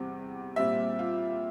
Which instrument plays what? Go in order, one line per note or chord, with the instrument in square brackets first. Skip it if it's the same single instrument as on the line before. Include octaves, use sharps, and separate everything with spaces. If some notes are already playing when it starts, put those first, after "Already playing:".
Already playing: [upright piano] E2 C3 G3 C4
A#2 G3 C4 E5
F4